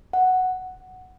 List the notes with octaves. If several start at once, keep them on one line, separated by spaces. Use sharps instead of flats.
F#5